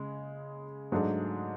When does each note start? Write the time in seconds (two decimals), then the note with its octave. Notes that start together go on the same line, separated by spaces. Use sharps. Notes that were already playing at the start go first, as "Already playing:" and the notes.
Already playing: C#3 G#3
0.92 G#2 F#3 A3 D4 G#4